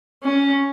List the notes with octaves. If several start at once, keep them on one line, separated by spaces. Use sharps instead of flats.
C#4